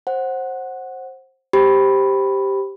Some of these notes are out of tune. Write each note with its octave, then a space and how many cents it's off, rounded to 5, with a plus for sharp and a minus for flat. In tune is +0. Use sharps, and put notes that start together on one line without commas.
C5 +20 F#5 +0
G4 +0 C5 +0 B5 +0